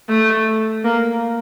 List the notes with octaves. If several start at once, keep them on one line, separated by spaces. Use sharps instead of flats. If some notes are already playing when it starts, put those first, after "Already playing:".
A3
A#3